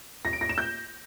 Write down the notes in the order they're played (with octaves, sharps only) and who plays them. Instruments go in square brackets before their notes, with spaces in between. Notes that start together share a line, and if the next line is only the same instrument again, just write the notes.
[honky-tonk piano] A#6
D7
A#6
E7
G6